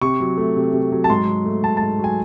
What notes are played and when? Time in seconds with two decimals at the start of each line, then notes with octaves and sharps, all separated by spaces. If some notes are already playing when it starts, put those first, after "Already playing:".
0.02 C3 C#6
0.20 F#3
0.37 A3
0.56 C3
0.73 C3
0.92 F#3
1.04 A5
1.10 G#2 C6
1.28 F#3
1.45 A3
1.63 G#2 A5
1.77 A5
1.81 G#2
1.99 F#3 G#5